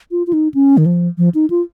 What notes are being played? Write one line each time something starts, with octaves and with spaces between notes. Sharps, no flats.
F4
F4
D#4
C#4
D#3
F3
F3
D#4
F4